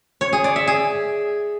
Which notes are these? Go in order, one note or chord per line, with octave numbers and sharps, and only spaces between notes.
C#5
G#4
D5
E5
G#4